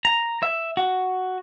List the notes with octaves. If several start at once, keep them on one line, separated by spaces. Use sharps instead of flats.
A#5
E5
F#4